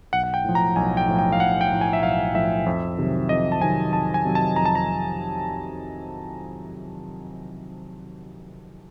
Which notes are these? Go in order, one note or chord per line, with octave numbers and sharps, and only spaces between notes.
B1 F#5
F#5
G5
A2 F3
A#5
B1 G#5
G5
A2 F3
G5
F5
B1 F#5
G5
A2 F3
G#5
E5
B1 F5
A2 F3 E5
F2
C3 D#3 F#3
F2 D#5
A5
C3 D#3 F#3 G#5
F2 A5
G#5
C3 D#3 F#3
A5
F2 A#5
A5
A#5